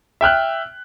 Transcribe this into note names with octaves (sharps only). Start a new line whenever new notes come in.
E5 G5 F6 F#6